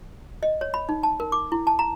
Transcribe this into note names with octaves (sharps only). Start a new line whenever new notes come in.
D#5
C#5
B5
D#4
A5
A#4
D6
E4
A5
A#5